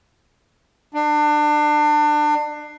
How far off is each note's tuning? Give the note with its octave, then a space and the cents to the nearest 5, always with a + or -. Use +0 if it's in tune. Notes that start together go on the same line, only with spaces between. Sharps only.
D4 +30